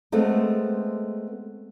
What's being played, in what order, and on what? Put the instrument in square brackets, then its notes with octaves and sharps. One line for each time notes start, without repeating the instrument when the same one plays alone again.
[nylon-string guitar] G#3 A3 B3 C4